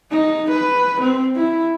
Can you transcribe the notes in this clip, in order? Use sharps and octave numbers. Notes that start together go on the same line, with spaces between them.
D#4
B4
C4
E4